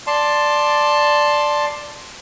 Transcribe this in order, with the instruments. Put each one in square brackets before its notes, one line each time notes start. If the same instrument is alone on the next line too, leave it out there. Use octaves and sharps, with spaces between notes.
[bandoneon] D5 A5 C6